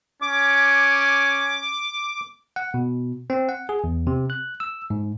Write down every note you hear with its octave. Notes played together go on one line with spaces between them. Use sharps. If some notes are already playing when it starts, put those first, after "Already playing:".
C#4 D6
F#5
B2
C4
F#5
G#4
E2
C3
F#6
E6
G#2